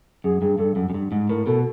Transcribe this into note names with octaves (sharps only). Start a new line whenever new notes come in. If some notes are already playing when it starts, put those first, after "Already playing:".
F#2 G#4
G2 G#4
G2 A4
F#2
F#2
G2
G#2
A2 A#4
B2 A4